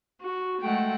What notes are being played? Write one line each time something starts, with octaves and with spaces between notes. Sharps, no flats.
F#4
G#3 A3 F#5 G5